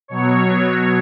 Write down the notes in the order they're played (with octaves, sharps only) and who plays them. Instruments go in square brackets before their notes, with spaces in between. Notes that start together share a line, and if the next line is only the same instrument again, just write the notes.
[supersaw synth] B2 F#3 C#5